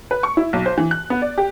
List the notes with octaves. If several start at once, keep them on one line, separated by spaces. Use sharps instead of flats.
B4
C#6
E4
B1
C5
E3
F#6
B3
D5
G4